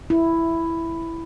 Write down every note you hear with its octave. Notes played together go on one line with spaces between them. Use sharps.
E4